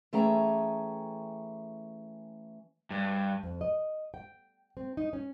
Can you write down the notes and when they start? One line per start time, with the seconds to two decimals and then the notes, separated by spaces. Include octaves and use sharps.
0.13 E3 A3 C#4 G#4 G5 A#5
2.90 G2
3.43 F2
3.61 D#5
4.14 G5
4.77 C4
4.97 D#4
5.13 C#4